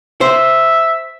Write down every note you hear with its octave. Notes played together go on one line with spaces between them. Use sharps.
C5 E5